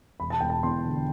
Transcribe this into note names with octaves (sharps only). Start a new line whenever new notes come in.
E1 B5
A5
E1 G5
A5
E2 C6
D3